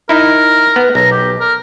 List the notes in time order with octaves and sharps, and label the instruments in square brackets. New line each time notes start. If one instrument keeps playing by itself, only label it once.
[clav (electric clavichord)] D#4 E4 [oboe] A#4
[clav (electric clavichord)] B3
[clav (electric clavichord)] B1 [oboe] A#5
[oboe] G4
A#4